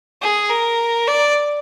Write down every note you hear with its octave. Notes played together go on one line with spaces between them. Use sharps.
G#4
A#4
D5